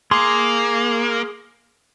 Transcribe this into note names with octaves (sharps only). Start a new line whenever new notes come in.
A#3 G#4 C6